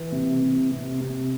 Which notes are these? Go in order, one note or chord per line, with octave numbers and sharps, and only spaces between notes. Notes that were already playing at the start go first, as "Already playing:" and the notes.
Already playing: E3
C3
C3
C3
C3